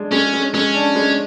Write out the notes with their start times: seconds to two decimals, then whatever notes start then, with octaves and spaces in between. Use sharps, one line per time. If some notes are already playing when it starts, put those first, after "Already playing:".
Already playing: G#3 D4
0.12 G#3 C#4
0.33 G#3
0.54 G#3 C#4
0.74 D4
0.95 G#3